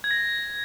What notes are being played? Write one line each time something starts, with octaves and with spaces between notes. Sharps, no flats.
G#6
A#6